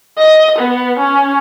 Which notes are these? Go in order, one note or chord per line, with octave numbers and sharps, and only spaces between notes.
D#5
B3
C#4